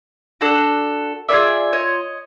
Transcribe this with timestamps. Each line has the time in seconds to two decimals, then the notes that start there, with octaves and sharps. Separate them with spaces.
0.41 D4 F#4 A4
1.28 A#3 D4 F4 G#4 D5 E5
1.73 C#5 D#5